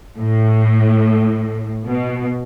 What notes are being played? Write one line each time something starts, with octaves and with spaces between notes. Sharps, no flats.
A2
B2